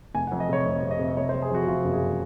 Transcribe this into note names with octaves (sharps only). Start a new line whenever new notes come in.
F1 G#5
F#5
F2
D#5
C3 C#5
F1 C#5
C3
D#5
C3
C3 C#5
C5
C3
G#4
F2 F#4
C3 F4
F#1
G#4